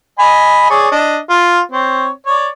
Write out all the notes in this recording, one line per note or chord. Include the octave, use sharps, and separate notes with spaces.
D#5 G#5 B5
G#4 C#5 D5
D4 D#5
F4
C4 C#5
C#5 D5